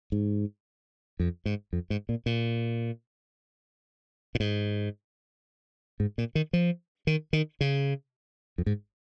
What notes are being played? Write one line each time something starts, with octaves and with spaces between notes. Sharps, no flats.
G#2
F2
G#2
F2
G#2
A#2
A#2
A#2
G#2
G#2
A#2
D#3
F3
D#3
D#3
C#3
F2
G#2